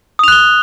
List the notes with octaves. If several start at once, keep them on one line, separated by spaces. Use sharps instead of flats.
D#6 F#6 F7 G7